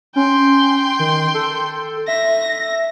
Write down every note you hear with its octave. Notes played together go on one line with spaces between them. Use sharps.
C#4 G5 C6
D#3
A4
E5 A#6